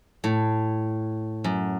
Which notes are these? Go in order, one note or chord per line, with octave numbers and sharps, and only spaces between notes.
A2
F#2